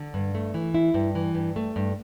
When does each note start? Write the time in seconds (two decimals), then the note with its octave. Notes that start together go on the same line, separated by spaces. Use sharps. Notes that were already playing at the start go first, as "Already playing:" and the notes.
Already playing: D3
0.14 G2
0.35 A3
0.54 E3
0.74 E4
0.94 G2
1.15 E3
1.35 G2
1.56 A3
1.76 G2